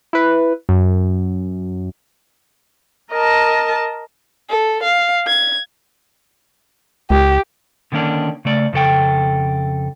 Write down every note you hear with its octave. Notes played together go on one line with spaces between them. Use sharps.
E4 B4
F#2
A#4 D#5 A5
A4
F5
G#6
C#2 G4
D3 D#3 A#3 C#4 D4
C#3 A3 D5
F2 C#3 A4 G5